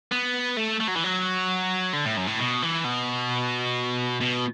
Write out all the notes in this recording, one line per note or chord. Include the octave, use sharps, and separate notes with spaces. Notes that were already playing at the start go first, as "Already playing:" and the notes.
B3
A3
A3
F#3
E3
F#3
D3
A2
F#2
A2
B2
E3
B2
B2